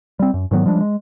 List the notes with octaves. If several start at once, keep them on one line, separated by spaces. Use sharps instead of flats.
G3 C4
F#2
G#2 D#3 F#3 B3
F3 G3 G#3 D4
G#3